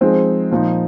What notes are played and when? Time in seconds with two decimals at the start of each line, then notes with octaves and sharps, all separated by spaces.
0.01 F3 G#3 C4 D#4
0.51 A#2 F3 A#3 D#4